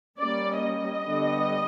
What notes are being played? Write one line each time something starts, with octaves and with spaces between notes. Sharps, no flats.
G3 A#3 C#4 D5
D#5
D3 G3 B3 D4